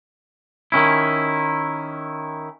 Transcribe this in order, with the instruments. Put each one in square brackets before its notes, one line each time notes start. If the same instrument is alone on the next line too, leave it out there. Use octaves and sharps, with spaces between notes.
[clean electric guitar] D#3 C#4 E4